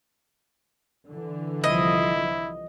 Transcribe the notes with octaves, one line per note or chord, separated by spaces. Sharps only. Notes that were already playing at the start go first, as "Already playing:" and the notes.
D3 E3
C2 F3 E4 D#5